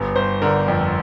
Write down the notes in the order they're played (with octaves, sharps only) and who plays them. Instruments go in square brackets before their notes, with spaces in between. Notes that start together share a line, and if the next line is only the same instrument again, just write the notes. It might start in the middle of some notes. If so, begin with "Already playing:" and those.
Already playing: [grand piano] G1
G1 C5
D3 A#4
F2